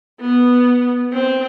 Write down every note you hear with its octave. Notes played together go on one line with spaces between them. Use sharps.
B3
C4